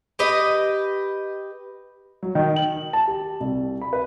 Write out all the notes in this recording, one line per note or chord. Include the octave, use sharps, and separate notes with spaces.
G4 B4 D#5
F#3
D#3
F#7
A5
G4
C2
B5
B4